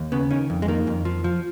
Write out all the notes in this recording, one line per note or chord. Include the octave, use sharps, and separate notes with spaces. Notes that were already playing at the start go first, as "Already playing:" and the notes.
Already playing: D#2
C#3 B3
D#3 C#4
F2
G#3
D#3 A#3
F2
F3
F3